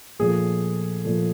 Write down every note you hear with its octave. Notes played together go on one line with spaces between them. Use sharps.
A#2 F3 A3 G#4
A#2 F3 A3